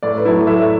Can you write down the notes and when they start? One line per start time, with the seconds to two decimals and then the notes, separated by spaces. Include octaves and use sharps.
0.03 A2 D5
0.17 B4
0.25 F#3 A3 E4
0.46 A2 E5